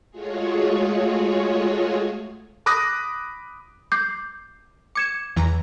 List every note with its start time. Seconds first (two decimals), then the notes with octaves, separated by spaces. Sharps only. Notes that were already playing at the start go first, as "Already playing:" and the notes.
0.11 G#3 A3 F4 F#4 G#4 C#5
2.66 B5 D6 D#6 F#6 A#6
3.92 D6 G6 C7
4.95 D6 G#6 C#7 E7
5.36 E2 E3 A#5